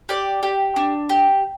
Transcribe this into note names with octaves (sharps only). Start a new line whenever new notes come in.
G4 D5
G4
D4
G4